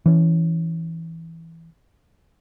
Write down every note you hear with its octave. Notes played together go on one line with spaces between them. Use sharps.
E3 C#4